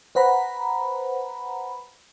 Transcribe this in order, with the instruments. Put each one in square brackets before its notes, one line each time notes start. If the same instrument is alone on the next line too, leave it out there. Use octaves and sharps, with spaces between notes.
[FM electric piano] B4 C5 F#5 A#5 B5